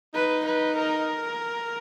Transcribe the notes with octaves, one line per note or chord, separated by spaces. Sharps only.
D#4 B4
B4
A#4